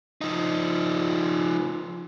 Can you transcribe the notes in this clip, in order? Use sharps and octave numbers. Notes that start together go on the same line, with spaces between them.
F3 D#4